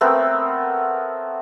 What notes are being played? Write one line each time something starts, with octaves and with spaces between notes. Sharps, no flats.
A3 B3 C4 A#4